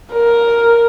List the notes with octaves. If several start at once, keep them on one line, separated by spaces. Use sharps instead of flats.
A#4